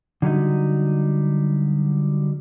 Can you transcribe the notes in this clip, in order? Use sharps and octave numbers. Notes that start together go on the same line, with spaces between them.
D3 F#3 G3 D#4